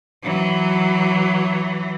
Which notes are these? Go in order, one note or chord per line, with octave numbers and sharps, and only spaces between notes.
E3 F#3